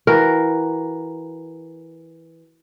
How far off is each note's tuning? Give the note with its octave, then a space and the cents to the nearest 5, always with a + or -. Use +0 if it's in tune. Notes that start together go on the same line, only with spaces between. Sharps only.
E3 -5 F#4 +0 A#4 +0